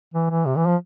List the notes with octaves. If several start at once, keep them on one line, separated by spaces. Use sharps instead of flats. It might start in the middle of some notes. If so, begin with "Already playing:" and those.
E3
E3
C3
E3
F3